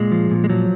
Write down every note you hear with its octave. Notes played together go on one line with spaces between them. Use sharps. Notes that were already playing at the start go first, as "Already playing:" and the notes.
Already playing: A#2 G#3
F3
A#2
G#3
F3 F#3